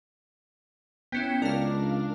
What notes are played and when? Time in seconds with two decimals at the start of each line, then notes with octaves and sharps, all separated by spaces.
1.12 B3 C#4 E4 G5
1.42 C#2 D4 A#4 F5